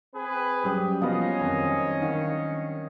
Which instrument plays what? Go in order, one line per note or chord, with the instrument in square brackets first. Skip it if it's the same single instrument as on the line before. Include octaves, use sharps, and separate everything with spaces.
[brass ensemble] C4 G#4 B4
[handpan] F#3 G3 C#4 [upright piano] G4 D#6
[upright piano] F3 B3 [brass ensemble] C#4 D#5 [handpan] F5
[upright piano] F2 [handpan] D#3 C4
[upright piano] D#3 [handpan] D4 F5 F#5